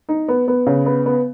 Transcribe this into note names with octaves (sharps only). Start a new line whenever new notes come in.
D#4
B3
B3
C#3
B3
B3